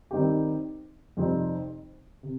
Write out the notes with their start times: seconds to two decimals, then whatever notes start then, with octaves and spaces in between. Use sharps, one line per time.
0.11 D#3 G3 C4 D#4 G4
1.17 F2 C3 G3 C4 D#4
2.23 C3